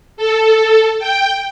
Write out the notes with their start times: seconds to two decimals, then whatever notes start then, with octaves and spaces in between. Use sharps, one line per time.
0.17 A4
0.99 G5